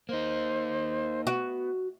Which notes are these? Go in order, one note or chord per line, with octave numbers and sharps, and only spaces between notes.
A#3 D#4 C5
B3 F#4